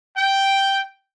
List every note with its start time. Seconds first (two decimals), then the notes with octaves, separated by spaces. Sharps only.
0.17 G5